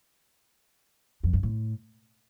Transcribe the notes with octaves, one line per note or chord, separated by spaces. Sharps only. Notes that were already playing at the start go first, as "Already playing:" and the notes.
F2
G2
A2